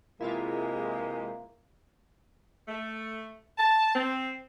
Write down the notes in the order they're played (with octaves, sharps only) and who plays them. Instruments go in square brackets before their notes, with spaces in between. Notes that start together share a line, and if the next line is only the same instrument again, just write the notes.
[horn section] C3 E3 G#3 [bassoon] A#3 [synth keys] E4 F4 A#4
[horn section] A3
A5
C4